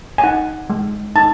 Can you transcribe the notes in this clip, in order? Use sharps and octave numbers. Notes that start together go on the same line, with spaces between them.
G#5
D#4 F#5
G#3
D#4 A5